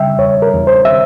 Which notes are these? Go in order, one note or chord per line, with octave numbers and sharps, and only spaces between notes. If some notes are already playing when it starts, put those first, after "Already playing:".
Already playing: C#3 G3 E5 G5
E2 C#5
A#4
E2
C5
E5